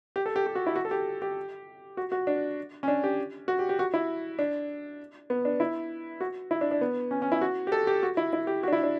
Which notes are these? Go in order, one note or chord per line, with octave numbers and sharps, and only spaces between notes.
G4
A4
G4
G4
F#4
E4
F#4
A4
G4
G4
F#4
F#4
D4
C#4
D4
G4
F#4
G4
G4
F#4
E4
D4
B3
D4
E4
F#4
E4
D4
D4
B3
C#4
C#4
E4
F#4
G4
A4
G4
F#4
E4
E4
G4
F#4
D4
E4
D4